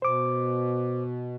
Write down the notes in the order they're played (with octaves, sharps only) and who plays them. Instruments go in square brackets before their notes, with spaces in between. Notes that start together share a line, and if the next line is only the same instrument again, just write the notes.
[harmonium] B2 [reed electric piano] C5 D6